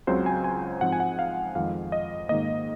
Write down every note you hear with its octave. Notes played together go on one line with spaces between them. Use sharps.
C#2 C#3 F#3 C4 C5
G#5
G#5
G#2 F3 C4 D#4 F#5
G#5
F#5
F5
F2 D#3 G#3 F5
D#5
G#2 D#3 A#3 D#5